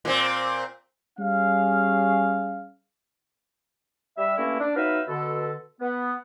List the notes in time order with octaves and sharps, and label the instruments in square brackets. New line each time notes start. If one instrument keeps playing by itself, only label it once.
[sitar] A#2 C4
[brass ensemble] G3 C#4 G#4 F5
[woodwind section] G3 E5
G2 A3 A#3 C#4 E4
D4
F#3 B3 D#4 B4 E5 F5
B2 D3 A4
B3